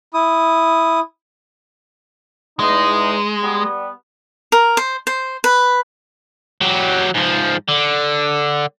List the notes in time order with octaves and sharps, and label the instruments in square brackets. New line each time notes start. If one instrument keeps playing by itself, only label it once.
[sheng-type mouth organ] E4 D#6
[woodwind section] E2 D#4 [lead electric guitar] G#3
[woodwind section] G3 B3
[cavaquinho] A#4
C5
C5
B4
[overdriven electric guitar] F#3 G4
G#2 F3
D3